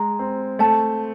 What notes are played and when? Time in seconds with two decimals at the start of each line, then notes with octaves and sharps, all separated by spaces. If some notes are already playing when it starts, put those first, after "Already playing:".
Already playing: G#3 A#5
0.19 C4
0.59 A3 A5